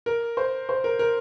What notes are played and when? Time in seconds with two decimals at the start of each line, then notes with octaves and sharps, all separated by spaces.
0.06 A#4
0.37 C5
0.69 C5
0.84 A#4
0.99 A#4